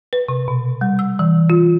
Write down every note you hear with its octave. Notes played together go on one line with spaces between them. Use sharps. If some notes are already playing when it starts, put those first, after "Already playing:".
B4
C3
B2
G3
E6
E3
F4